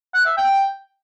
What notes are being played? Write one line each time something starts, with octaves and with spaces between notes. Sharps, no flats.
F#5
E5
G5